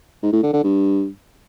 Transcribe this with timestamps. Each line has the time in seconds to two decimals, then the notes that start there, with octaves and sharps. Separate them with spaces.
0.23 G#2
0.33 A2
0.43 D3
0.53 D3
0.63 G2